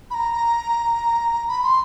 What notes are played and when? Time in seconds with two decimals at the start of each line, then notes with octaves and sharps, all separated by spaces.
0.10 B5
0.14 A#5
1.48 B5
1.63 C6